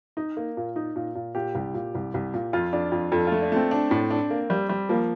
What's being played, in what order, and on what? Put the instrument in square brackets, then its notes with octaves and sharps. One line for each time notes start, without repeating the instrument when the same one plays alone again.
[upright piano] D#4
A#3
A#2
D#4
A#2
A#2
[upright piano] A#2 [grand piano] G4
[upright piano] C2
A#2
C2
C2
A#2
[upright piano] F2 [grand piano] F4
[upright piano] F2 [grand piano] D4
[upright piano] F2
[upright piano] F2 [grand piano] A4
[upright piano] A3 [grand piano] F4
[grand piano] D4
[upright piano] A3 [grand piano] C4
[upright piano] D4
A2
D4
A#3
G3
G3
[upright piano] F3 [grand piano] A#3